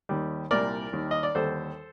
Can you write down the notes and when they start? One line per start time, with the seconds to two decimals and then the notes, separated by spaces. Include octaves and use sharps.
0.09 D#2 D#3 G3
0.51 C2 A#2 G3 A#4 D5
0.93 D#2 D#3 G3
1.11 D#5
1.23 D5
1.35 D#2 D3 G3 A4 C5